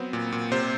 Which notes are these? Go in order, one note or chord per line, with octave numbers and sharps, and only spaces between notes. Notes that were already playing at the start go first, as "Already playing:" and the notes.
Already playing: F#3 B3 C4 C5
A#2
A#2
C3 C5